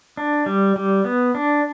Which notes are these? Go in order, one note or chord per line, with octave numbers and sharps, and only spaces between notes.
D4
G3
G3
B3
D4